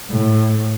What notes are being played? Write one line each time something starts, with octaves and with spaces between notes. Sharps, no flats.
A2